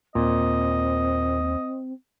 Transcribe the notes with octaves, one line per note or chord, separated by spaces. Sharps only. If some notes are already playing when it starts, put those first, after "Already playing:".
D#2 A#2 C4 D#5